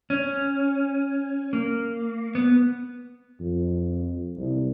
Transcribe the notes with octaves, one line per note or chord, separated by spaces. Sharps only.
C#4
A#3
B3
F2
C2